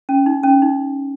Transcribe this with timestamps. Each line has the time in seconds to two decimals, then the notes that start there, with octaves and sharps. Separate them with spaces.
0.09 C#4
0.26 D#4
0.43 C#4
0.62 D#4